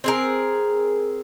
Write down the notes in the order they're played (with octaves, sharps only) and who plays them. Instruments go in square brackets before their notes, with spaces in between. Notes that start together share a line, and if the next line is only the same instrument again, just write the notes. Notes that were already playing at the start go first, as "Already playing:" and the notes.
[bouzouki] C4 G#4 A#4